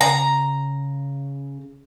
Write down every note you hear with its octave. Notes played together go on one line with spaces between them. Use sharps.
C#3 A#5